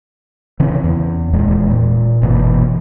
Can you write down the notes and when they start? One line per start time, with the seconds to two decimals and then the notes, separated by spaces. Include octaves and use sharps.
0.60 C#3 E3 C4
0.84 E2
1.33 D#1 E2 A#2 G#3
1.71 A#2
2.22 G1 B2 E3 A#3